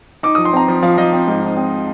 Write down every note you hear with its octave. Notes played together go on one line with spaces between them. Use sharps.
D#4 D6
F3 D#6
C6
C4 A#5
F3
F3 F5
F3 D#5
C4
G#2
D#4
C4